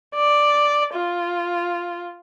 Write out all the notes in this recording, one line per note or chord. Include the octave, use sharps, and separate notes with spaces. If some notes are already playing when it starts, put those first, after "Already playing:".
D5
F4